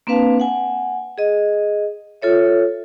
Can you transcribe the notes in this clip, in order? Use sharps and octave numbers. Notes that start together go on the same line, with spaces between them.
A#3 C4 D4 B4 F5 A5
F#5 G#5
G#4 D#5
F4 A4 C#5 E5